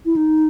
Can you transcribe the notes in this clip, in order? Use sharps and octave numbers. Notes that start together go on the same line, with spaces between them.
E4
D#4